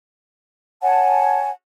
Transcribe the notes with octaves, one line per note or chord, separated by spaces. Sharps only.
C#5 F#5 G#5 A5